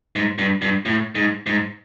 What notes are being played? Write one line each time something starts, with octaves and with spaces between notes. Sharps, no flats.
G#2
G2
G2
A2
G#2
G#2